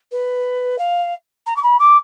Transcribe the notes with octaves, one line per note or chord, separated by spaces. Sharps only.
B4
F5
A#5
D6
B5
D6